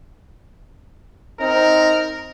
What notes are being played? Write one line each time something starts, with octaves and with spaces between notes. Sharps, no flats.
C4 D#4 A#4